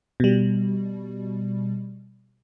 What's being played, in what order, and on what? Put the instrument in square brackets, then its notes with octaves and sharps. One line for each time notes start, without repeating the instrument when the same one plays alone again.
[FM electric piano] B2 G3